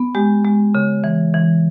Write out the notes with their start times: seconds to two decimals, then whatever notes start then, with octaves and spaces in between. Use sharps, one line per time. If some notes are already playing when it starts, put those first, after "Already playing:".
Already playing: B3
0.15 G#3 G4
0.45 G#3
0.75 C#3
1.04 E3
1.34 E3